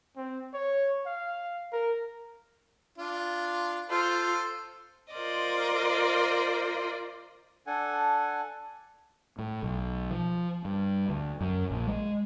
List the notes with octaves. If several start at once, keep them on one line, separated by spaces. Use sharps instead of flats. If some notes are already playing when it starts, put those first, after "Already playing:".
C4
C#5
F5
A#4
D4 F4
F4 A4 C5
F4 A#4 C5 D5 D#5
D4 A4 F#5 G#5
A2
B1
F3
G2
D2
F#2
A#1
G#3